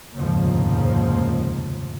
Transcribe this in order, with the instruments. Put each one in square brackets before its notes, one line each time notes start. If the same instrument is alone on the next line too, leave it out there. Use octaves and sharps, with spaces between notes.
[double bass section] F1 D#2 G#2 C#3 F3 A#3